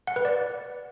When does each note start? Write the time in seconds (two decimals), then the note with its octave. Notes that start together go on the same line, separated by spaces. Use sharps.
0.07 F#5
0.16 B4
0.25 D5